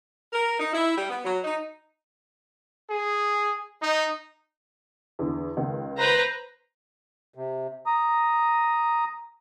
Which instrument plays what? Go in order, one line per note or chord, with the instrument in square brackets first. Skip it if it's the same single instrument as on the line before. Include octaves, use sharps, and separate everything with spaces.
[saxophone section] A#4
D#4
E4
G3
B3
F#3
D#4
[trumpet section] G#4
D#4
[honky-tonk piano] E2 D3
C#2 D#3
[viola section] B4 C5 A#5
[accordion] C3
A#5 D#6